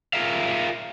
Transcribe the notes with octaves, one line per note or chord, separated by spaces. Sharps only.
F4 G#4 A#4 E5 F5